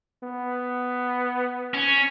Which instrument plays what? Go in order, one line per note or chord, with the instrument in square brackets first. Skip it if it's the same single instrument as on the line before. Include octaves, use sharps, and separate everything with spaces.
[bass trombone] B3
[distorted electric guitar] C#4